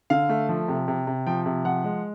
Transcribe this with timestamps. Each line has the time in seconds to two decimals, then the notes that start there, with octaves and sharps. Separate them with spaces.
0.10 D3 F5
0.29 A3
0.49 F3
0.68 C3
0.88 C3
1.07 C3
1.27 F3 G5
1.46 C3
1.65 F3 F#5
1.84 G#3